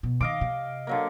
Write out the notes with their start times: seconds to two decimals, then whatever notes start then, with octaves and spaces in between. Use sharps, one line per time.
0.03 B2
0.21 D#3 D#5 F5 D6
0.41 C3
0.87 D3 F#3 A#3